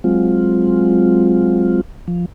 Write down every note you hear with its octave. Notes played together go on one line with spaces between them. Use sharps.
F#3 G#3 C4 F4
F3